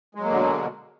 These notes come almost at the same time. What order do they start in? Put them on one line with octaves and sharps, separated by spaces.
G#3 F#3 A#3 D3 B2